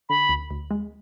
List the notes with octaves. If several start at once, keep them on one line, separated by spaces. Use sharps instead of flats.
D3 B5
D2
D2
G#3